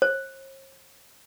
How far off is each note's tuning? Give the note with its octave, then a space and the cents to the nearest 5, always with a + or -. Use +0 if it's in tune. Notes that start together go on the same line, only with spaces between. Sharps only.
C5 +45